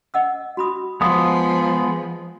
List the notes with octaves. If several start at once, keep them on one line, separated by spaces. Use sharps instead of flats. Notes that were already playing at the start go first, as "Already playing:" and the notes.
D#5 F#5 E6
F#4 B5 D#6
F3 G#3 B3 F5 C6 D#6